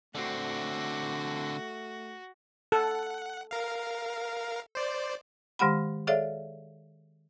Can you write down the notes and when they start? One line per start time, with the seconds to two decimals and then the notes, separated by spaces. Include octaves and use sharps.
0.15 D3 A3 C4 F#4
2.72 A4 F#5
3.51 A#4 F5
4.75 C5 D5
5.59 D#3 G#3 G4 F#5 B5
6.07 G#4 A4 C#5 D5 E5 F5